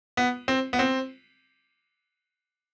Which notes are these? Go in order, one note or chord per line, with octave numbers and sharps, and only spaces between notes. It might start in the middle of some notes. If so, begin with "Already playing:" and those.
B3
C4
B3
C4